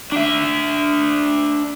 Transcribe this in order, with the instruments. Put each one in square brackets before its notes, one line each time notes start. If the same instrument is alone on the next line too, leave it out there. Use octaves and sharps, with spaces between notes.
[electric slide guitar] D4 E5